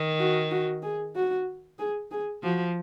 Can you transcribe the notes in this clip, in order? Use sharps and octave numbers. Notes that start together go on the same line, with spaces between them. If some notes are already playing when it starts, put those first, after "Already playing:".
Already playing: D#3
F#4
F#4
G#4
F#4
G#4
G#4
F3 F#4